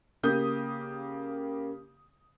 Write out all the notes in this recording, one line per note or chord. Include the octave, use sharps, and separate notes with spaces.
C#3 A#3 G4 D#6 G6